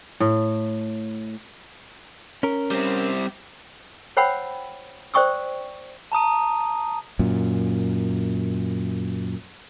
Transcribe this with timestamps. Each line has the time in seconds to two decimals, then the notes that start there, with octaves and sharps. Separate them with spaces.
0.20 A2
2.43 C#4 A#4
2.71 G3 C4
4.17 C5 C#5 F#5 G5 B5 E6
5.14 C5 D5 G5 C#6 D#6 E6
6.12 A5 A#5 D#6 D#7
7.19 F#2 A#2